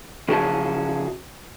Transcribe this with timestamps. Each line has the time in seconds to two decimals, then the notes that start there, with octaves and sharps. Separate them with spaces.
0.29 C#3 F3 F#4 G#4 D#5 A5